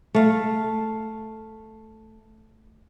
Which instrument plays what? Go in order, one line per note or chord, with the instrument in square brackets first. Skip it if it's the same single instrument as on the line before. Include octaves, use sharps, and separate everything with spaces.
[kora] A3 F5